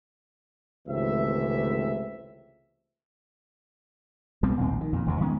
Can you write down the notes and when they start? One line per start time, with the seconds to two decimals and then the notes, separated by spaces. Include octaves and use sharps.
0.87 G#1 C#2 C3 E3 A3 E5
4.43 B1 G3 B3 C4
4.58 A#1 D#2 A2 C4
4.81 D#3
4.93 F2 A#2
5.06 G1 D#2 C3
5.20 D#3 G#3 B3 C#4